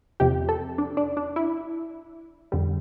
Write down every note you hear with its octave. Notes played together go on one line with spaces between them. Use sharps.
E2 C3 F3 G4
A4
D4
D4
D4
E4
F2 D3 G3